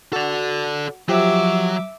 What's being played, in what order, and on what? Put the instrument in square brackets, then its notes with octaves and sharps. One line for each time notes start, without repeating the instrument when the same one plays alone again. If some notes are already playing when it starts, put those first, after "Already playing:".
[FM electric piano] F#4 [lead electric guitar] A4 D5
[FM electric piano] F3 G4 [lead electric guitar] F#3 [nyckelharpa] E5 D6